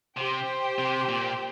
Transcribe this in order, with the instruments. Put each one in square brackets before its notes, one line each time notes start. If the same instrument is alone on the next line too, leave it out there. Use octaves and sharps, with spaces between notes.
[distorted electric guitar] C3 [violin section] G4 C5 G5
[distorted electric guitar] C3
A#2